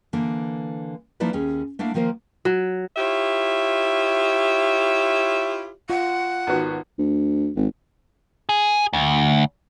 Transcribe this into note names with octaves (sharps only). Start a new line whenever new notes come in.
D3 E3 A#3
F3 A#3 D#4 E4 B4 D5
D#2 C#4 G#4
A3 A#3 D4 E4 F5 F#5
D#3 F3 A#3 A#4 C5
F#3
E4 F4 G4 C#5 E5
F4 F#5
G#1 B3 F#4
D2
G#1
G#4
D2